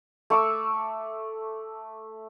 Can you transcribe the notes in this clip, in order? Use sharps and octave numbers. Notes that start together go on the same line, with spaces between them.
A3 C#6 D6 E6